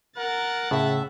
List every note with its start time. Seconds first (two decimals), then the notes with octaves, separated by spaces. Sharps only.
0.17 A#4 F#5 A6
0.71 A2 C#3 E5